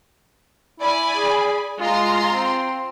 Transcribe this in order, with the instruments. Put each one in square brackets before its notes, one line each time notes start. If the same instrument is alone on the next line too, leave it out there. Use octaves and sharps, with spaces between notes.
[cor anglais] E4 [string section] D5 G#5 B5
[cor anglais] G#4
[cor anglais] G#3 [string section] F4 A#5 C6
[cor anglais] C4